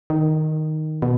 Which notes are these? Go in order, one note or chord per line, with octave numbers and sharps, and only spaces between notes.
D#3
B2